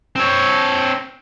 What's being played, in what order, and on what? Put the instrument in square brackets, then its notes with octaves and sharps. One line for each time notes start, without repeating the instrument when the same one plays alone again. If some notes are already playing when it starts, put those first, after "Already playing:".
[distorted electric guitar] C4 C#5